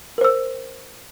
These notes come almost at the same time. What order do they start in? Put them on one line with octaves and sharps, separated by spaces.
A#4 C5 E6